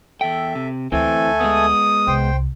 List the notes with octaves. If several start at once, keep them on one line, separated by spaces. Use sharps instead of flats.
E2 A4 E5 G5
C3
D2 E3 A3 C4 A4 G#5
G#3 B3 D#6
C2 C5 G5